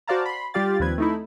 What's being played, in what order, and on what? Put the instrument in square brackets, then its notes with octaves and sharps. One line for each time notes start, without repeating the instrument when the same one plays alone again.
[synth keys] F#4 C5 D5 F5 A5 A#5
B5 C6
G3 F4 G4 D5 F5 A6
D#2 F3 C4 B4 G#6
A3 D#4 E4